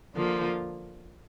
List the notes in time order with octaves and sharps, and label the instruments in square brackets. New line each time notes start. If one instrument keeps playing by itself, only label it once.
[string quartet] D3 F3 A#3 F4